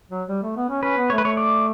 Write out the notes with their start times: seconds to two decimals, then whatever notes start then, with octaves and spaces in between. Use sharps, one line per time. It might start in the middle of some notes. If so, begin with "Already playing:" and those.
0.10 F#3
0.29 G3
0.42 A3
0.57 B3
0.69 C#4
0.83 C#4 B4
0.97 B3
1.10 A3 C#5
1.18 B4
1.23 A3 C#5
1.37 D5